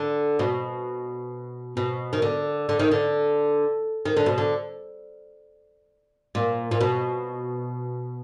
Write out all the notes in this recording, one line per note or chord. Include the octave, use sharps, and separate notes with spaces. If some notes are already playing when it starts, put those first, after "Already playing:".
Already playing: D3
B2
B2
D#3
D3
D3
D#3
D3
D#3
D3
B2
D3
A#2
A#2
B2